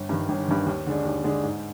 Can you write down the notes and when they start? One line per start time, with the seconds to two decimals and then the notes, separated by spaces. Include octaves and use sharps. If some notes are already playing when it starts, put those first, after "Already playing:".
Already playing: G1
0.09 G2 D#3
0.29 G1
0.48 G2 D#3
0.66 D#2
0.86 D3 G#3 D4
1.05 D#2
1.24 D3 G#3 D4
1.43 G#2